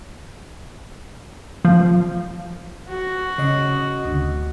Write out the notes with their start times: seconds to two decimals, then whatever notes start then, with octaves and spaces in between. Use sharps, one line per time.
1.65 F3
2.88 F#4
3.38 C#3 D#5
4.05 D2